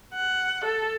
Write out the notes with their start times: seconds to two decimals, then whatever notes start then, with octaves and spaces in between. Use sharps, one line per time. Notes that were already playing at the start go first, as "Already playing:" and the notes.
0.14 F#5
0.65 A4